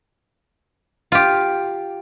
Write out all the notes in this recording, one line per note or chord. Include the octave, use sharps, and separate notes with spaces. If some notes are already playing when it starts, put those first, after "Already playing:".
F4 G4